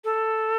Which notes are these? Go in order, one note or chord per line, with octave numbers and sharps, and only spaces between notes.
A4